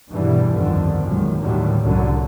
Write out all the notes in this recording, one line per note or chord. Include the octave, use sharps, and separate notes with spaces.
E2 G2 B2 D3 E3 G3
G1 C2 F2 D3 D#3
A#1 F#2 A#2 D#3 G#3
D#2 A2 D3 D#3 F#3 G3
C2 F#2 D3 F#3